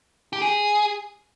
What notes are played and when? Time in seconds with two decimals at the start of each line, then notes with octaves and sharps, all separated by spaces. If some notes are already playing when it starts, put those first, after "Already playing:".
0.33 G4
0.42 G#4